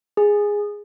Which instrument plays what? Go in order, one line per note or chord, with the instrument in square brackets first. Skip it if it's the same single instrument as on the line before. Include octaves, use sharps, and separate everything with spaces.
[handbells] G#4